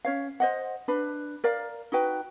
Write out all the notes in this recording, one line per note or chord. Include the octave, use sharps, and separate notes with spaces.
C#4 C#5 F5
C5 D#5 F#5
D4 B4 B5
A#4 D5 F5
D#4 F#4 B4 G5